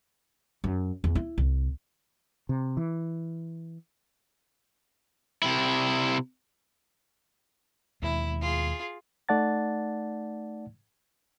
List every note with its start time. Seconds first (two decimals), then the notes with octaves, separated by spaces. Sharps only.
0.64 F#2
1.04 E2
1.15 E4
1.38 C2
2.49 C3
2.77 E3
5.43 C3 E4
8.02 D#2 B2 G#3 E4
8.41 F4 G#4
9.29 A3 D#4 D5 F#5 A5 A6